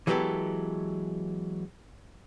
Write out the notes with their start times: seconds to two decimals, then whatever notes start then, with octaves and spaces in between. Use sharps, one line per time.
0.07 E3 F#3 G#3 B3 G4 A4